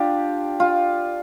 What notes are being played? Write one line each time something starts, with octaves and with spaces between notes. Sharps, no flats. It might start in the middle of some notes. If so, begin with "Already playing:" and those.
Already playing: D4 F4 G4
F4